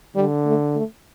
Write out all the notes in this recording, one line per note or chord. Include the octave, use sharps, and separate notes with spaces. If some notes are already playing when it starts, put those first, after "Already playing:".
D3 G3
A3
A3